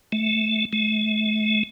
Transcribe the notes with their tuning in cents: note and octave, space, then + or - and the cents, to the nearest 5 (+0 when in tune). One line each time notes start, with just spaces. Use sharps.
A3 -15
A3 -40